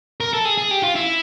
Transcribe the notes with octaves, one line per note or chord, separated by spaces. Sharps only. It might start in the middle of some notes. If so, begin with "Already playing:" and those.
A#4
A4
G#4
G#4
G4
F4
E4